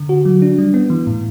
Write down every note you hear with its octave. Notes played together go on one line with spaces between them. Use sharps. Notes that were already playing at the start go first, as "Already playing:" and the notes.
Already playing: D3
F#4
F#3
D4
G3
B3
E3
A2